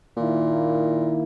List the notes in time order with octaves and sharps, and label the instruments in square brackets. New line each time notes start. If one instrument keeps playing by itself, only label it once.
[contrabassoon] A#2 [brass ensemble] D#3 A#3 E4